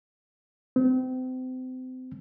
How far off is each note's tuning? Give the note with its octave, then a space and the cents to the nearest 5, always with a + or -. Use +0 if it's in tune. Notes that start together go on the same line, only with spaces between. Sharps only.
C4 -35